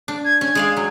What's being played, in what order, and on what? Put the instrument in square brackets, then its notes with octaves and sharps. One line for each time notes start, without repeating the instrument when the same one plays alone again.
[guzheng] D4
[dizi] G#6
[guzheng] C#4 [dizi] G#6
[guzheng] G#3 D5 F5
F#3